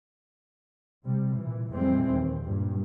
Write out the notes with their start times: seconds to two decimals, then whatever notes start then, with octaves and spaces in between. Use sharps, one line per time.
1.05 C3 G3
1.39 A#2 E3
1.69 F2 A#2 E3 G3 G#3 C4
2.10 D#2
2.43 G2 A#2